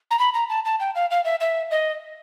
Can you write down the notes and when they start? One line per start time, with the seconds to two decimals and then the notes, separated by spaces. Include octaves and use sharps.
0.11 A#5
0.19 B5
0.34 A#5
0.49 A5
0.65 A5
0.80 G5
0.95 F5
1.11 F5
1.25 E5
1.41 E5
1.71 D#5